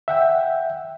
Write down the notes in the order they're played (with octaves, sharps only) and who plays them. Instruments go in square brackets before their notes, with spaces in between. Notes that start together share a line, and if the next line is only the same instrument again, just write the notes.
[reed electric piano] E5 F#5 G5